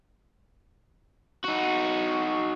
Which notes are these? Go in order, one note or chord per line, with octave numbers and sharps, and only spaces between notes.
D#4 F#4